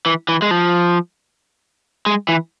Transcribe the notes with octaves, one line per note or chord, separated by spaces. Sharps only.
E3
E3
G#3
F3
G#3
E3